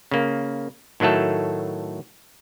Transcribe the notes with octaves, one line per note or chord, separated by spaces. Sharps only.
C#3 A#3
A2 D#3 F#3 A3 A4